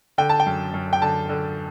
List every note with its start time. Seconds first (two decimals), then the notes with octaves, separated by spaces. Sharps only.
0.18 D3 G5
0.29 A5
0.40 G5
0.46 F#2
0.74 F#2
0.93 G5
1.02 D3 A5
1.29 D3